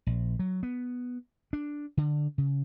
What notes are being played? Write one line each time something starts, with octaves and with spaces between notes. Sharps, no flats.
A#1
F#3
B3
D4
D3
C#3